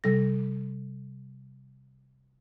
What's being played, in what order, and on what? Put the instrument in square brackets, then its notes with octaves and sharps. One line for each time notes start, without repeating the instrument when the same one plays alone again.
[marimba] C3 G3 A4 A#6